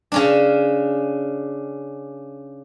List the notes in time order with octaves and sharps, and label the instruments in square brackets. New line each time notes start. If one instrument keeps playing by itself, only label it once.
[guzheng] C#3 C#4 D4